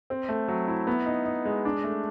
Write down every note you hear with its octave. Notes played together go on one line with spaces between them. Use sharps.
C4
A3
F#3
E4
B3
D#4
D#4
G#3
D4
A3